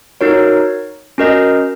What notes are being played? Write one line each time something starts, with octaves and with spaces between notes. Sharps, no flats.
D#4 F#4 A#4 C#5
C#4 F#4 A#4 D#5